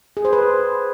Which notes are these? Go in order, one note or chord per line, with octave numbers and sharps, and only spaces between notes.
G#4
C5
B4